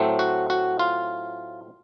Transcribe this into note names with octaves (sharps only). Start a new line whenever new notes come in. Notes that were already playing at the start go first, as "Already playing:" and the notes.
Already playing: A2 F#3 A3 C4
F#4
F#4
F4